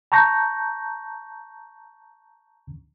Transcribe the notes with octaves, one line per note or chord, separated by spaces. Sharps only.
A5 A#5 C#6 G6 A#6